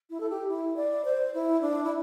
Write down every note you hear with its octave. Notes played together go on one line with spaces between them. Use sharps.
E4
A4
G4
E4
D5
C5
E4
D4
E4